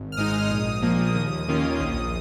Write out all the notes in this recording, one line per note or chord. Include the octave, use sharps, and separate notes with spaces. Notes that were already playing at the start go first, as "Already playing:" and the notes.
Already playing: G#1
F6
G#2 G#3 D#4 D#6
A#1 D#6
A#2 F3 A#3
D#2
D#3 A#3 C#4 F4
A#1